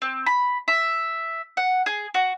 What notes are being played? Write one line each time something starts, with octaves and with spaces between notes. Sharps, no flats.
C4
B5
E5
F#5
G#4
F#4